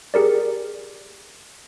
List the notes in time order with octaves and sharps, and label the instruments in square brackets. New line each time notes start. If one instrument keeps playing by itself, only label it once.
[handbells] G4 G#4 A#4 D5